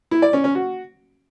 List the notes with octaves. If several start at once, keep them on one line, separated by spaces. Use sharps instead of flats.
E4
D5
C#4
C#4
F#4